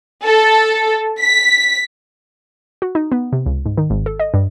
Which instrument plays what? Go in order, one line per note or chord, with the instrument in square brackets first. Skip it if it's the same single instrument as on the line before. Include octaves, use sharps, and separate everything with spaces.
[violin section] A4
B6
[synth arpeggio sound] F#4
D#4
B3
C3
C#2
G#2
D#3
G#1
A4
D#5
G2